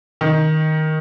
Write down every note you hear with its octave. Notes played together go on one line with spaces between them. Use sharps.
D#3